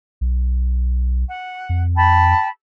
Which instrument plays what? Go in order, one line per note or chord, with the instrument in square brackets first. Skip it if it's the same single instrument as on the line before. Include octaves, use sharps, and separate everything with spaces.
[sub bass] B1
[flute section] F#5
[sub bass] F2
[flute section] G5 A5 B5